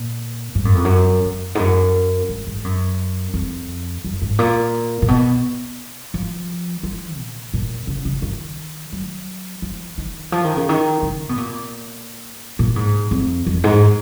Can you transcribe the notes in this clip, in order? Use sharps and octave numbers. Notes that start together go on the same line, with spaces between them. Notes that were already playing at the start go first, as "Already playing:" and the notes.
Already playing: A#2
G#2
F#2
F2
F#2
F#2
G#2
F#2
G#2
G#2
F#2
F2
F#2
G#2
A#2
A#2
B2
F3
F3
A#2
A#2
C#3
C#3
D#3
F#3
F3
D#3
F3
D#3
C#3
D#3
C#3
B2
A#2
A#2
G#2
F2
F2
G#2